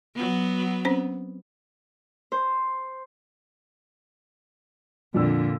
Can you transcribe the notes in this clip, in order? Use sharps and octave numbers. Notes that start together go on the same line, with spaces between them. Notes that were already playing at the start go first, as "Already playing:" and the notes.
F#3 B3
C4 C#4 C5
C5
F2 A#2 D3 D4 E6